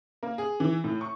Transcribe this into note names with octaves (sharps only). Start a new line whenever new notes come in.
A#3
G#4
E3
A2
C#6